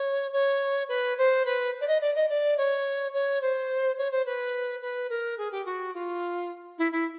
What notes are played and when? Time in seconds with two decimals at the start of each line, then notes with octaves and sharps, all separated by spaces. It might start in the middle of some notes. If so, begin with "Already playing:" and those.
Already playing: C#5
0.33 C#5
0.88 B4
1.18 C5
1.45 B4
1.81 D5
1.87 D#5
2.01 D5
2.15 D#5
2.29 D5
2.57 C#5
3.13 C#5
3.42 C5
3.98 C#5
4.11 C5
4.26 B4
4.82 B4
5.09 A#4
5.38 G#4
5.52 G4
5.66 F#4
5.94 F4
6.78 E4
6.92 E4